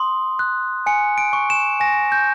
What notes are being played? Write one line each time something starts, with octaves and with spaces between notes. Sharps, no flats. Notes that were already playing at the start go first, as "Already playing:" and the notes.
Already playing: C6 D#6
F#6
G#5 C#7
D7
C#6
E7
G#5 A#6
G6